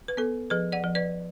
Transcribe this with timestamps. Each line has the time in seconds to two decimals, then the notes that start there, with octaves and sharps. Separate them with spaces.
0.08 B4
0.17 B3 A4
0.50 F3 G#4 B4
0.72 D5 F#5
0.84 F3
0.95 B4 D5